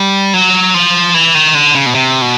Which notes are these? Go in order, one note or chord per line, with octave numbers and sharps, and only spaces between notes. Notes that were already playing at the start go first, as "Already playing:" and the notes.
Already playing: G3
F#3
F3
E3
D#3
D3
C#3
B2
C3
B2